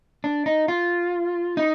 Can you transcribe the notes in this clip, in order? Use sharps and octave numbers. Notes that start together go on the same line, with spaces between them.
D4
D#4
F4
D#4